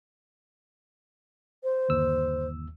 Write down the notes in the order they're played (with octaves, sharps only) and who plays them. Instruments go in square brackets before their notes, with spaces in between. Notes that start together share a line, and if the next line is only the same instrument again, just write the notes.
[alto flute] C5
[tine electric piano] G1 D#2 E6